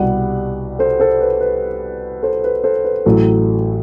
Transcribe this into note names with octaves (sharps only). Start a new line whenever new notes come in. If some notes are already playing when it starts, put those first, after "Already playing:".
Already playing: C2 B2 G3 D5 F#5
A4 C5
A4 C5
B4
B4
A4 C5
B4
A4 C5
B4
A1 A2 F#3 A4